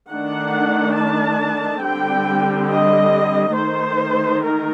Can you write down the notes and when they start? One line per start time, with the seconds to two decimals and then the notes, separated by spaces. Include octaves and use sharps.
0.10 D#3 A3 D4 F#5
0.97 A5
1.84 D3 G3 C4 G5
2.69 D#5
3.55 D#3 A3 D#4 C5
4.42 A#4